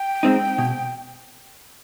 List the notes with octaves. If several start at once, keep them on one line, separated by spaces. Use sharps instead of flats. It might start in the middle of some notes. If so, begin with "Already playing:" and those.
Already playing: G5
G#3 C4 D#4
B2